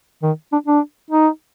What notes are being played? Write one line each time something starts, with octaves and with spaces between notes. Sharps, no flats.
D#3
D4
D4
D#4